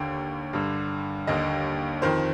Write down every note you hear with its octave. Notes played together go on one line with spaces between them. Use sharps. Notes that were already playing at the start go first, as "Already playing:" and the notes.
Already playing: D#2 D3 G5
G2 D3
D#2 D3 D#5
F2 D#3 C5